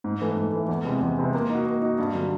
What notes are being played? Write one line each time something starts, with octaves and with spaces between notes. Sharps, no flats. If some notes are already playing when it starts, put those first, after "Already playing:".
G#2
E3 A3
G#2
E3 A3
E2
C3 E3 G#3 C4
E2
C3 E3 G#3 C4
A#3
D#4 F#4
A#3
D#4 F#4
G2
D3 F#3